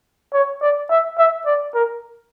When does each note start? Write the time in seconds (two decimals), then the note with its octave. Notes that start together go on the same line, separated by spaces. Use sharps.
0.33 C#5
0.62 D5
0.90 E5
1.18 E5
1.46 D5
1.75 A#4